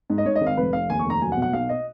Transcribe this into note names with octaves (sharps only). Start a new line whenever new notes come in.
G#2
D#5
G#2 C#5
D#5
G#1
F5
F1 B4
F1 F5
D#2 G#5
C#6
F1
A#5
F#3 G#5
F#5
B2
F#5
B1 F5
D#5